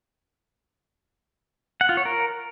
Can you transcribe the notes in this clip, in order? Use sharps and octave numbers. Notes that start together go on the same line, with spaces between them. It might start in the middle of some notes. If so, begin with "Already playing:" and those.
F#5
F4
C#5
A#4